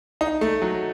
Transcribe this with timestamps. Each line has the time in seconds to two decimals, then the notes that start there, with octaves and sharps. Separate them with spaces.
0.21 D#4
0.41 A3
0.62 F#3